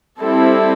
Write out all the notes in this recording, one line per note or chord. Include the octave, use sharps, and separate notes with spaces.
G3 C4 E4 A4